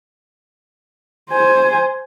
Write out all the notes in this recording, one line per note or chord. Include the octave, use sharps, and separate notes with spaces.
C5 G#5